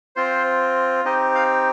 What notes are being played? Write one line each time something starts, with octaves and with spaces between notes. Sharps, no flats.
C4 F4 C5
C4 D#4 G4 D#5
F5